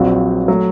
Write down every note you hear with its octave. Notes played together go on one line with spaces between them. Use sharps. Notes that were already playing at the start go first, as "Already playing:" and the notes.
Already playing: A#1 A#2 F#3 C4 F#4
F#3 A3